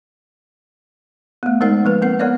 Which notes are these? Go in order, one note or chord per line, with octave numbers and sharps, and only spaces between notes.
A3 B3
G#3 D#4 A#4 C5 F#5
F3 A#3 B4
C4 A#4 F#5
B3 A#4 C#5 D5 F5